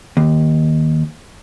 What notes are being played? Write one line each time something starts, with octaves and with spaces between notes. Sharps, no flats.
D#2